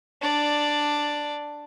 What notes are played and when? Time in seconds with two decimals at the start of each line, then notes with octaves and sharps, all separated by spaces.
0.22 D4 D5